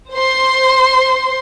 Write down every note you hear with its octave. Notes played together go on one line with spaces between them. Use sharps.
C5 C6